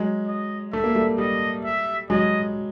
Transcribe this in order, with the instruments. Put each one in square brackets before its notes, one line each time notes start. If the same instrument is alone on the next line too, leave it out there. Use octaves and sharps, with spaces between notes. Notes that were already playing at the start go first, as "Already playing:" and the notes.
Already playing: [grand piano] F#3 G#3
[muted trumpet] D#5
[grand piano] A3 [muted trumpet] E5
[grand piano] A#3
G3 A3
[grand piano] G3 [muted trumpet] D#5
[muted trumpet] E5
[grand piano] F#3 G#3 [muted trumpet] D#5